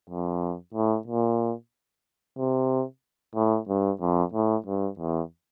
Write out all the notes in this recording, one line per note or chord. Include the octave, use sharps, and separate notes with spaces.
F2
A2
A#2
C3
A2
G2
F2
A2
G2
E2